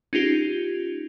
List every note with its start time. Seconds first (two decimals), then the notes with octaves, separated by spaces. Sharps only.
0.13 C#4 D#4 F4 G4